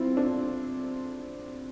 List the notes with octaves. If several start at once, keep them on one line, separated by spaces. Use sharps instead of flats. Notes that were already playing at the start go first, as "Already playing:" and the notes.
Already playing: C4 E4 F4
D4